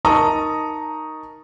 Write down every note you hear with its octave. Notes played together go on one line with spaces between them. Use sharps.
D#4 A#4 A5 A#5 C#6 D#6